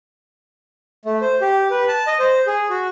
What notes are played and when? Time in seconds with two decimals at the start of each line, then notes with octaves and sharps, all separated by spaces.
1.05 A3
1.21 C5
1.41 G4
1.71 B4
1.88 A5
2.07 D#5
2.19 C5
2.47 G#4
2.70 F#4